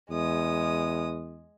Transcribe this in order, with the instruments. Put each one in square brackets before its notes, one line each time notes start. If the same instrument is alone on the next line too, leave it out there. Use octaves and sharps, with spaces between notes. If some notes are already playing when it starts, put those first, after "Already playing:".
[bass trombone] E2 [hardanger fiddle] G#3 D#6